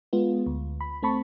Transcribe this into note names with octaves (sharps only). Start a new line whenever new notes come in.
G#3 B3 F4
D2
B5
A3 C4 A5 B5 C#6